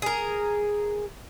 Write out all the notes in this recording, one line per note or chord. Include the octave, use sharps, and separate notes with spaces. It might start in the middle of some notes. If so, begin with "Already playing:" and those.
G#4 A#4